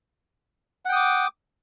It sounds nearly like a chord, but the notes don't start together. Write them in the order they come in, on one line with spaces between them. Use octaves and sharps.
F#5 G5 D#6 D6